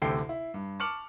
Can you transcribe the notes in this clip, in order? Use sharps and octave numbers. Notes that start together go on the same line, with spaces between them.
A1 D2 C3 A4 G5 C7
E4
G2
A5 C#6 D6 F6 C#7 F#7